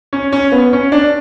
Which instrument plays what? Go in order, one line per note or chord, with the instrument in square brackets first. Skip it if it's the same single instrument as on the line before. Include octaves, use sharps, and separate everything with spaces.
[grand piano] C#4
C#4
B3
C#4
D4